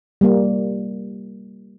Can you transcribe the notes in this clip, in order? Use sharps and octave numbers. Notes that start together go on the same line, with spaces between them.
G3 A#3